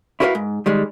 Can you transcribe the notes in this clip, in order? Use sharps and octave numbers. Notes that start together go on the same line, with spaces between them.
E4 F#4 A#4 B4 D#5 F5
G#2
D#3 G3 G#3